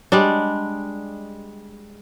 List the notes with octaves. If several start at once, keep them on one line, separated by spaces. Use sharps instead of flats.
G3 G#3 D4